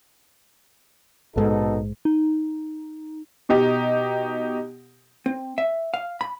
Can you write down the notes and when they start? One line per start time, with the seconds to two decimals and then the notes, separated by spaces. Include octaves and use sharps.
1.36 A#1 G#2 B2 G#3 D#4 A4
2.05 D#4
3.49 B2 D#4 G4
5.26 C4
5.58 E5
5.94 F5
6.21 B5